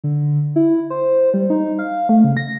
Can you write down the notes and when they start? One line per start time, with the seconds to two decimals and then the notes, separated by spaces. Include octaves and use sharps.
0.04 D3
0.56 E4
0.90 C5
1.34 G3
1.50 D#4
1.79 F5
2.09 A3
2.24 C#3
2.37 A#6